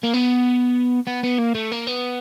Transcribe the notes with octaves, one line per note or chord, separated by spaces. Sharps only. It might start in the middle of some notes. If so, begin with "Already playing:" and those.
A#3
B3
B3
B3
A#3
A3
A#3
B3